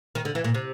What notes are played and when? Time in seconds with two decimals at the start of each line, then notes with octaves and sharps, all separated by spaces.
0.15 D#3
0.25 D3
0.35 E3
0.44 A#2
0.54 C3